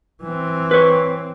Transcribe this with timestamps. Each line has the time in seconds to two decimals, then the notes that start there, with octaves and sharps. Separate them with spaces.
0.23 E3 C4
0.71 B4 C#5